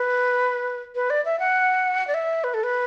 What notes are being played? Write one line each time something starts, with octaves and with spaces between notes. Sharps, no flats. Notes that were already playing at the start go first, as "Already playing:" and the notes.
Already playing: B4
B4
D5
E5
F#5
D5
E5
B4
A4
B4